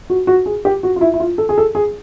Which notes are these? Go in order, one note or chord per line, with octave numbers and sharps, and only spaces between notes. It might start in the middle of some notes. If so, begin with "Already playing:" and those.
F#4
F#4
G#4
G4
F#4
F4
E4
E4
F4
A4
G#4
A4
G#4